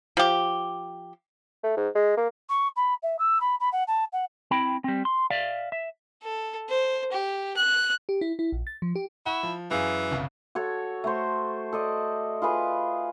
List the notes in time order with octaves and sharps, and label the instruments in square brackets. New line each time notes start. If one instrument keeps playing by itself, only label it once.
[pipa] F3 G4
[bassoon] A3
G#2
G#3
A#3
[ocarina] C#6
B5
E5
E6
B5
B5
F#5
A5
F#5
[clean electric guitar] C4 E4 G5 B5
G3 C4
C6
D5 E5 F5
E5
[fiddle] A4
C5
G4
F#6
[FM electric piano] G4
E4
E4
A#1
A6
F3
G4
[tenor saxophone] E4 [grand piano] F#5 C#6
[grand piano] F3
[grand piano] F#2 G#4 F5 [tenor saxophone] E3
[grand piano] G1 C2 C#3
[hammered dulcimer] F#4 A4 C#5
A3 F#4 C5
A4 D5 D#5
F4 G#4 B4